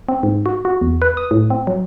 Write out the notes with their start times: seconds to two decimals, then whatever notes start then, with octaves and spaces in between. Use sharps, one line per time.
0.09 C4
0.23 G#2
0.46 F#4
0.65 F#4
0.81 E2
1.02 B4
1.17 D#6
1.31 A2
1.50 C4
1.67 F#3